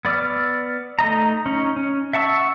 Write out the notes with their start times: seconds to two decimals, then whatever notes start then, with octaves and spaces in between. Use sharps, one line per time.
0.05 B3 D5 D6 E6 F6
0.99 A3 D#4 D#5 A#5
1.46 C#4 D#4
1.76 C#4
2.13 E5 F#5 A5 C#6 E6